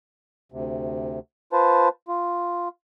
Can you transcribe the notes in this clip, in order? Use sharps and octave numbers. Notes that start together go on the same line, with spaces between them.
D2 C3
F4 B4 C5 A5
F4